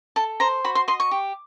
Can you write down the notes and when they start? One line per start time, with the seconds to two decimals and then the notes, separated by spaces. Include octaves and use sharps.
0.16 A4 A5
0.40 C5 A#5
0.65 F#4 B5
0.75 C6
0.88 D#5 C6
1.00 C#6
1.11 G4